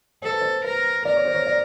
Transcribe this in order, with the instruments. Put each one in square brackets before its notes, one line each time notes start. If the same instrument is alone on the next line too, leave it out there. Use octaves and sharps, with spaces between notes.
[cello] A4 [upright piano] C5
[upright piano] B4
C5
[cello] A#4 [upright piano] B4
[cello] A#4 [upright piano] D5
[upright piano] C#5
C5
C#5
D5